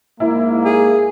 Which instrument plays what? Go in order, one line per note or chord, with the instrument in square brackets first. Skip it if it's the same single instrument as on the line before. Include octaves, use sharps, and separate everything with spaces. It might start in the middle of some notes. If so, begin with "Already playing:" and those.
[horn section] G#2 A#3 [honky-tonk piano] E4
[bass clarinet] G#4